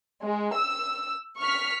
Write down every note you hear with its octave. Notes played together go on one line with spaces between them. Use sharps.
G#3
E6
C#6 F6 B6